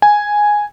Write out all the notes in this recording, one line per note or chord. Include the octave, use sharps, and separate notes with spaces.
G#5